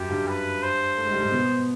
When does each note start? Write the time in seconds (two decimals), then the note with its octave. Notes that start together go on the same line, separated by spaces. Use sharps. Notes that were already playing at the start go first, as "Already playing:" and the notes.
Already playing: F#2 F#3 G4
0.09 G2 G3
0.28 B4
0.63 C5
0.98 A3
1.05 G#3
1.13 G3
1.20 G#2 G#3
1.32 B2 B3